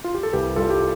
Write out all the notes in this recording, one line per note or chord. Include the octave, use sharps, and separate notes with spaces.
F4
G4
A4
C2 G4 B4
G3 F4 A4
G4